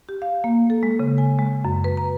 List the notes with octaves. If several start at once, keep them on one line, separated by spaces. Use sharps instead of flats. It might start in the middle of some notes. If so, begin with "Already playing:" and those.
G4
F5
A#3
A4
G#3
C#3
G#5
G#3
F#2
B4
A#5